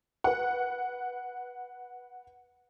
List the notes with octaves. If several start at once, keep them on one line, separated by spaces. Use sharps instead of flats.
B4 F#5